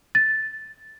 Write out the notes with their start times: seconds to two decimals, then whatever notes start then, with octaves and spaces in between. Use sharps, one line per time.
0.15 A6